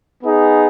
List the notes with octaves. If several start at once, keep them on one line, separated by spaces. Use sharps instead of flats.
B3 D#4 G#4